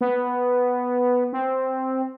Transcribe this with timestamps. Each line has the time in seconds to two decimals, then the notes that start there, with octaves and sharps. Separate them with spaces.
0.01 B3
1.33 C4